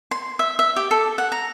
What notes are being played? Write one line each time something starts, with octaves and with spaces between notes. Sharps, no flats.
C6
E5
E5
G4
A4
F#5
A#5